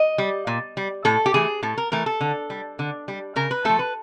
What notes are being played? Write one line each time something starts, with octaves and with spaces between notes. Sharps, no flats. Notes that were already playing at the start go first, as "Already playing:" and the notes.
Already playing: D#5
G3
A#2
G3
A2 A4
G4
E3 A3 G#4
A2 A4
A#4
E3 A3 A#4
A4
D3
G3
D3
G3
C#3 A#4
B4
F3 A3 A4
B4